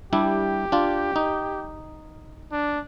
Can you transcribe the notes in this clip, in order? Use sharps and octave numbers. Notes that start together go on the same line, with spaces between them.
G3 D4 E4 G4
D4 F4
D#4
D4